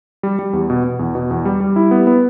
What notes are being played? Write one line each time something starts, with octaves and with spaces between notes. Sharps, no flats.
G3
G3
E2
B2
B2
E2
B2
E2
G3
G3
E4
B3
B3